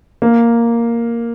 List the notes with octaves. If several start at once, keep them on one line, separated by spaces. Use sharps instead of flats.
A#3